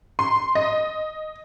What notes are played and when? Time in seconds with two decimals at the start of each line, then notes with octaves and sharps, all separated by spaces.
0.19 C6
0.55 D#5